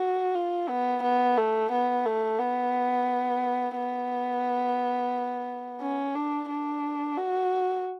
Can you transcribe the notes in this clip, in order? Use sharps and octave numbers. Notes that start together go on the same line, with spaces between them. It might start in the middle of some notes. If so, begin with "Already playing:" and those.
Already playing: F#4
F4
B3
B3
A3
B3
A3
B3
B3
C#4
D4
D4
F#4